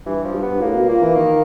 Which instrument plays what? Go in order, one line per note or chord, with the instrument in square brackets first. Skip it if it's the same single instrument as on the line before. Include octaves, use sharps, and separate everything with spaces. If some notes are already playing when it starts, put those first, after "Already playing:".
[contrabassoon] G2 [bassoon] E3
[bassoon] F3
[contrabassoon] G2
[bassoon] B3
[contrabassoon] A2 [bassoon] A#3
[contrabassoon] B2
[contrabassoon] A#2 [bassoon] A#3
[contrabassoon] E3
[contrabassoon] D#3 [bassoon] A#3